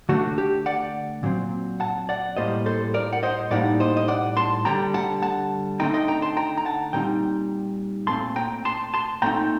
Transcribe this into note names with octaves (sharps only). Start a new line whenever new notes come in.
D3 A3 D4 F#4
G4
D5 F#5
A#2 F#3 C4
F#5 A5
D5 F#5
A2 G3 A#3 C5 D#5
A4 C5
A#4 D5
F#5
C5 D#5
A2 G3 A#3 D#4 D5 F#5
C5 D#5
D#5
D5 F#5
A5 C6
D3 G3 D4 G5 A#5
F#5 A5
F#5 A5
D3 A3 C4 D#4 G5 A#5
D#5 G5
G5 A#5
A5 C6
G5 A#5
A#5
F#5 A5
A#2 G3 C4 D#4 G5 A#5
A#2 A3 C4 A5 C6
G5 A#5
A5 C6
A5 C6
A#2 A3 C4 D#4 G5 A#5